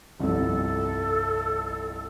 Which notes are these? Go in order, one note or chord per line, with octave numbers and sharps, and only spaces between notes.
G1 C2 F2 A4